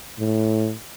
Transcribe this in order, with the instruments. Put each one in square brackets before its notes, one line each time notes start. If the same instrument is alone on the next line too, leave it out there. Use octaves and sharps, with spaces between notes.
[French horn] A2